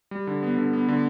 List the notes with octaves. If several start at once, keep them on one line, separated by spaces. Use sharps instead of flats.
G3
D3
B3
D3
B3
D3